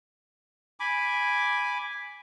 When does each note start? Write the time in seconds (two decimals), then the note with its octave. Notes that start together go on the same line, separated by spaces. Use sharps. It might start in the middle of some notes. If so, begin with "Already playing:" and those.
0.80 G#5 B5 D6